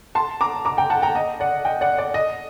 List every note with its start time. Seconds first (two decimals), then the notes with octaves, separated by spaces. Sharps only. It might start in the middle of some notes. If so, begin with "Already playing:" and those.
0.15 A5 C6
0.41 A#5 D6
0.65 A#5 D6
0.77 G5 A#5
0.90 F#5 A5
1.02 G5 A#5
1.15 D#5
1.40 D5 F#5
1.65 D#5 G5
1.81 D5 F#5
1.98 D5 F#5
2.14 D#5